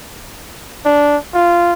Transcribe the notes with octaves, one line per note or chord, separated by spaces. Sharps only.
D4
F4